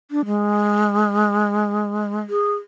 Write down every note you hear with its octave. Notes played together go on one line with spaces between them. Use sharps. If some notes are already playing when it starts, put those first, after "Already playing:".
D4
G#3
G#4